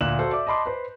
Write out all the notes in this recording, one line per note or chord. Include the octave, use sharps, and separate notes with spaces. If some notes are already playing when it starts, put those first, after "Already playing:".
D2 A#2 F#6 E7 F#7
F#4 A4 C5
D5 E5 D6
D#5 A5 B5 C6 D6
B4 C5